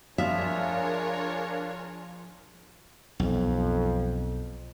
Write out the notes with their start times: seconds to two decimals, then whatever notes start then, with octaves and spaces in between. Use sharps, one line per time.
0.18 F3 D4 F4 G#4 A#4 C#5 E5 F5
3.20 B1 F2